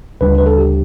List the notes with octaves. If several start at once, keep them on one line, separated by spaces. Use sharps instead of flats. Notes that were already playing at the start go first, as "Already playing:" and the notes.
D2 C#3 G3 D4 B4
B4
A4
G4